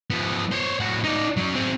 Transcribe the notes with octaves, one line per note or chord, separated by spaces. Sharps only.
F3 B3
C5 C#5
A2 F#4
D#4 D5
F#3 C#4
C4 G#4